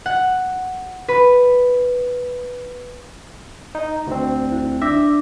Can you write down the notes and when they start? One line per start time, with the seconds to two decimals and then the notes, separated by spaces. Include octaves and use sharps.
0.06 F#5
1.08 B4
3.75 D#4
4.07 D2 C4
4.52 E4
4.82 D4 E5 D6 A#6